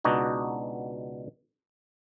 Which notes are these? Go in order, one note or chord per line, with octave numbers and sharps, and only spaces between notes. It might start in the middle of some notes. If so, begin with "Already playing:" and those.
C#2 B2 D4 D#4 F#4